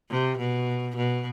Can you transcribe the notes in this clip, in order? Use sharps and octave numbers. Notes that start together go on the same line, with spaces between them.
C3
B2
B2